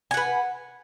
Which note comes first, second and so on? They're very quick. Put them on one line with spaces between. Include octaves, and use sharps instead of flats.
G#5 F#5 B4